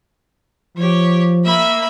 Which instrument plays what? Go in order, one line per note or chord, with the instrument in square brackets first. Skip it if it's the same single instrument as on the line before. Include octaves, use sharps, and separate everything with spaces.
[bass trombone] F3 [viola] G4 C#5
[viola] A#3 [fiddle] E5 B5